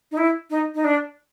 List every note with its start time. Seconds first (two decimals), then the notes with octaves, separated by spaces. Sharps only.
0.11 D#4
0.17 E4
0.50 D#4
0.75 D#4
0.84 D4